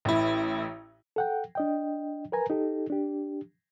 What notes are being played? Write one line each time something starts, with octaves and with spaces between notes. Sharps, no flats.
A1 E4
A4 F#5 G5
D4 D#5 G5
A#4 B4 G#5 A#5
D#4 G4 A4
D4 G4